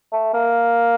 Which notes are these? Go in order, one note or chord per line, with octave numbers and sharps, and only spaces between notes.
A3
A#3